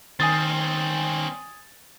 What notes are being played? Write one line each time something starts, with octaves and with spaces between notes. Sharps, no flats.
D#3 C4 C#4 G#5 D#6 A6